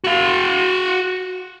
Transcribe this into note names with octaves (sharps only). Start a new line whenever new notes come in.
F#4 F5